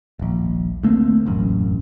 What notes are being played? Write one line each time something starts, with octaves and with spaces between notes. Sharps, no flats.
D#1 A#1
D2 A3 A#3 C4
E1 A1 F#2